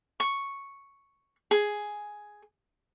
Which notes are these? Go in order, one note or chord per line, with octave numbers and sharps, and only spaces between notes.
C#6
G#4